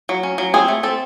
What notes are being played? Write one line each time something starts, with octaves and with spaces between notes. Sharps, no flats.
F#3
C#4
F#3
C4 G#4
A3
C4 A4